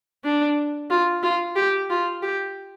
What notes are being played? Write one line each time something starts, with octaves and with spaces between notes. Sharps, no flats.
D4
F4
F4
G4
F4
G4